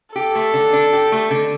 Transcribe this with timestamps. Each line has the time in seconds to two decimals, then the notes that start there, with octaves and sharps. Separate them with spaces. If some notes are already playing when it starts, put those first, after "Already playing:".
0.15 G4 A4
0.35 A3
0.54 D3
0.73 D4
0.93 G4
1.12 A3
1.31 D3